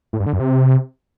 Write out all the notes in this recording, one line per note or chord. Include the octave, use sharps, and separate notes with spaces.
A2
G2
D3
F#2
C3